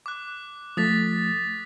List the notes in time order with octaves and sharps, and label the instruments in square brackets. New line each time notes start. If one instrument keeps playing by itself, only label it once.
[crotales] D6 F#6
[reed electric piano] F3 A3 [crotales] D#6 A6 B6